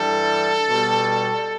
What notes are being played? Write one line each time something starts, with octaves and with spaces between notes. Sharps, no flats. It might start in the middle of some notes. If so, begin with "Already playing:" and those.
Already playing: G2 E3 G3 A4
B2 G3